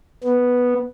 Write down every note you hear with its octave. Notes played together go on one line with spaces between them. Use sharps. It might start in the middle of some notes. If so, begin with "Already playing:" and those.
B3